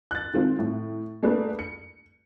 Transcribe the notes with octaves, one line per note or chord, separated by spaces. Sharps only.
F#6 A6
D#3 G#3 C4 F4
A2
A3 A#3 D4 G#4 B4
C#7